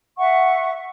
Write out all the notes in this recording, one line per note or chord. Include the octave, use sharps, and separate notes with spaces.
E5 F#5 C#6